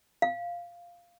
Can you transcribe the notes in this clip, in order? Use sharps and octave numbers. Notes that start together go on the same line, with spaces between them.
F5